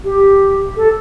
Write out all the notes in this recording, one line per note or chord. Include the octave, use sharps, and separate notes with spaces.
G4
A4